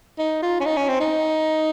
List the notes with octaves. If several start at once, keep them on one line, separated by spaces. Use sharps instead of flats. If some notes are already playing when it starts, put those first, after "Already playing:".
D#4
F4
C#4
D#4
C#4
C4
D#4